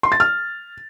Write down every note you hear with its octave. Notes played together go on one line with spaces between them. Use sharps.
C6
A6
F6